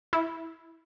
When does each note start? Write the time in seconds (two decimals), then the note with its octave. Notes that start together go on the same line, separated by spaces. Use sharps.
0.13 E4